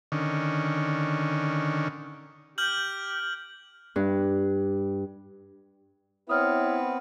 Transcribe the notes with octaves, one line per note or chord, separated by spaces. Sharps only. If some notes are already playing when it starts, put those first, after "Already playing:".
D3 D#3 C#4
G4 F6 G6 F#7
G2
B3 C4 E4 B4 C#5 D#6 F6